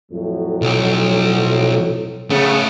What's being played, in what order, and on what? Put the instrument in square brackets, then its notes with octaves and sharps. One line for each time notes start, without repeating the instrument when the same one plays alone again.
[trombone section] F2 A2 F#3
[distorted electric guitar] B1
[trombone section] C#3 [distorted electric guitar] A3 B3